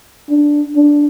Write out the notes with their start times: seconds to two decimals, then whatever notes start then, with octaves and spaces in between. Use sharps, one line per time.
0.30 D4
0.76 D4